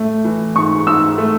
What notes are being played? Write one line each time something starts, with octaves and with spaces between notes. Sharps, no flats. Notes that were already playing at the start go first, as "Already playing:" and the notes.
Already playing: A2 A3
E3
G#2 C#6
G#2 E6
A3